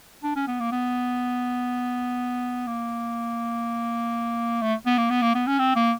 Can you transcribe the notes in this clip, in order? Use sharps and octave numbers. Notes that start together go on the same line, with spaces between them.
D4
C#4
B3
A#3
B3
A#3
A3
B3
A#3
B3
A#3
B3
C#4
C4
A#3